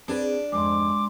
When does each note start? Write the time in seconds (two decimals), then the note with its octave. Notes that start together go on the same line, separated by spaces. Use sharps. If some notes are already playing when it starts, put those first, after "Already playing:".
0.08 C4 D4 G#4 B4
0.52 F2 G#2 G#3 C6 D6